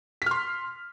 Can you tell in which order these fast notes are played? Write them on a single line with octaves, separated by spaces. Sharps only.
B6 F6 C6